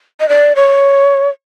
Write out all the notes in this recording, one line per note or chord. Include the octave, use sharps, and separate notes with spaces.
D#5
D5
C#5